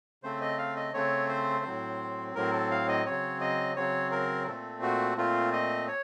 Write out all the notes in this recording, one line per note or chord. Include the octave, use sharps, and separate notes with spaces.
C#3 A3 C4 C5
D#5
F5
D#5
C#3 A3 C4 C#5
C5
A2 F#3 C4
A2 F#3 C4 A#4
A4
F5
D#5
C#3 F#3 C4 C#5
D#5
C#3 F#3 C4 C#5
A#4
A#2 A3 C4 A4
F#4
A#2 A3 C4 F4
D#5
C#5